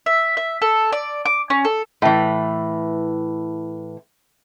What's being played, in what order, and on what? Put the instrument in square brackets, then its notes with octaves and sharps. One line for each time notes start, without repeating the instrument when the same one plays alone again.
[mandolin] E5
E5
A4
D5
D6
C#4
A4
[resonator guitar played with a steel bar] A2 E3